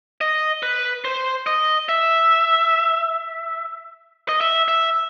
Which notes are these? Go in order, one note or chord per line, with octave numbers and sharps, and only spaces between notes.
D#5
B4
C5
D#5
E5
D#5
E5
E5